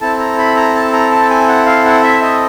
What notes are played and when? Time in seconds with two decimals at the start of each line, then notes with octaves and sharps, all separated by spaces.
0.01 C4 E4 A4 A5
0.19 A#5
0.38 B5
0.56 A#5
0.75 A5
0.93 A#5
1.11 A5
1.30 G#5
1.48 F#5
1.66 F5
1.85 F#5
2.03 E5
2.22 D#5